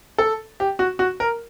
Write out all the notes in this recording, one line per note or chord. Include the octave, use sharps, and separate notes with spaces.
A4
G4
F#4
F#4
A#4